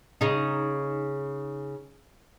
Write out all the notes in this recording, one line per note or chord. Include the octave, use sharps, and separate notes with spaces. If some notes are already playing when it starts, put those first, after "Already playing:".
C#3 D#4